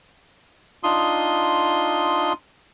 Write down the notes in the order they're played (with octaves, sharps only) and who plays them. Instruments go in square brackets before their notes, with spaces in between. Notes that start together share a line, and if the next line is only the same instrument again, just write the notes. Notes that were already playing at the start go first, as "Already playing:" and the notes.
[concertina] D4 D#4 F4 C6 D#6